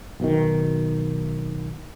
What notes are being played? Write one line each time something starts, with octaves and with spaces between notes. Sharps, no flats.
B1 B2 D#3